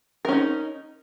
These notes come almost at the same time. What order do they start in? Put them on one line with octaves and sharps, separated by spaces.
A#4 C#4 D#4